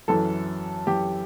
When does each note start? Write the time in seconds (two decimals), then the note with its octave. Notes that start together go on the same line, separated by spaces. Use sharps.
0.08 F#2 E3 A4
0.87 F#2 E3 G4